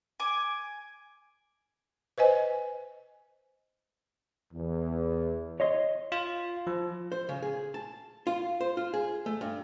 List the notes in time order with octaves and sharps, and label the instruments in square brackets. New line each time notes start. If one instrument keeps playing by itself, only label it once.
[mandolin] G#5 D6
[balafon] B4 C5 D#5 G#5
[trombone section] E2
[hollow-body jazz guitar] C#5 D#5 C6
[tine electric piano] F4
F3
[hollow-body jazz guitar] C5
C#3
G#4
A5
F4
C5
F4
G#4
A3
G2